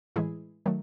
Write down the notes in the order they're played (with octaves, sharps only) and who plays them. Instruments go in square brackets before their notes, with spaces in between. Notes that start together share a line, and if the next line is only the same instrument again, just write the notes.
[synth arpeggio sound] A2 E3 G#3 E4 G#4
D#3 F#3 A3